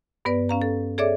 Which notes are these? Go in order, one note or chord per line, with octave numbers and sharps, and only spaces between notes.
G2 B3 B4 D5
C#4 F5 A#5
A4
G#4 A4 C#5 D5 E5 D6